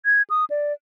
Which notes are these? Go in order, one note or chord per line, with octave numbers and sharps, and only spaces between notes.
G#6
D#6
D5